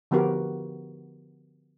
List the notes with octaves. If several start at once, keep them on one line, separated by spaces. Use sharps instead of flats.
D3 F3 B3 F#4 G4 A#4